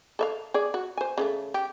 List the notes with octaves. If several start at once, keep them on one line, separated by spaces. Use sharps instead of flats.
A4 E5 F5
G#4 D5
F#4
C5 G#5
C#3 F3 A3
G4